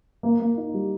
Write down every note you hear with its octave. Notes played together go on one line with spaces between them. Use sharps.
A#3
A#3
D#4
G3